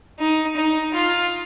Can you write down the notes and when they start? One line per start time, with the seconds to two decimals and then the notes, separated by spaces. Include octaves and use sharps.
0.19 D#4
0.57 D#4
0.94 F4